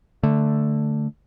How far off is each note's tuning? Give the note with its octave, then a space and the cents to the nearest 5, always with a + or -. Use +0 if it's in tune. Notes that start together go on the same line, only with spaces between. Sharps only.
D3 +0 A3 +0